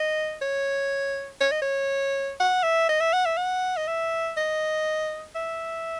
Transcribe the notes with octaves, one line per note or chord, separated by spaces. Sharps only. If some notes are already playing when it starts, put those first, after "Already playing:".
Already playing: D#5
C#5
C#5
D#5
C#5
F#5
E5
D#5
E5
F#5
E5
F#5
D#5
E5
D#5
E5